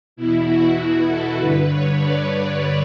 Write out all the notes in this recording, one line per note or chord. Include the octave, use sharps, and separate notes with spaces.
E2 B2 E4
F#4
F#4
A4
G2 D3 B4
C#5
D5